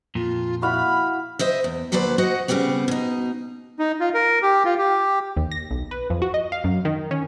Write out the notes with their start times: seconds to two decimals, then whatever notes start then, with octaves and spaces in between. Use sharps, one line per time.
0.15 F2 A#2 F4
0.62 E4 F#4 F5 B5
1.39 C5 D#5 E5
1.64 E2
1.92 D2 A#2 F#3 B4 C5 D5
2.18 F#4 C5 D#5 F#5
2.48 C#3 G3 B3 C4 B4
2.88 B2 D#4
3.79 D#4
4.00 F4
4.14 A#4
4.42 G4
4.65 F4
4.78 G4
5.36 D#2
5.52 A#6
5.71 B1
5.91 B4
6.10 F2
6.22 F#4
6.34 D#5
6.52 F5
6.64 F#2
6.85 D#3
7.11 C#4